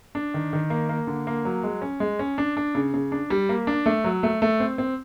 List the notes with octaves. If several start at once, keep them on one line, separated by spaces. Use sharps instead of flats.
D4
D#3
D#3
A#3
A#3
D3
A#3
F#3
G#3
C#4
G#3
C#4
D4
D4
C#3
C#3
D4
G3
A#3
D4
A3
F#3
A3
A3
C4
C4